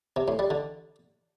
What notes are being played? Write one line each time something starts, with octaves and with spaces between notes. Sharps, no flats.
C3
A2
G3
D3